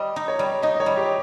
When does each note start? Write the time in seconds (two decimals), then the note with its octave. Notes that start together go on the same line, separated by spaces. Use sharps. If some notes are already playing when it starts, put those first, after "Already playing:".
Already playing: G3 D#5
0.16 D#4
0.28 C#5
0.39 G3
0.62 D#4 D#5
0.80 C#5
0.86 G3
0.97 G4